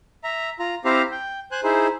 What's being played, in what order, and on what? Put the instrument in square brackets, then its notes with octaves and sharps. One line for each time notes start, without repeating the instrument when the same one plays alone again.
[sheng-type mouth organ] E5 A#5
F4 A#5
C4 E4 G4 C5 F5 A#5
G5
C5 G#5 F#6
D#4 E4 G#4 C5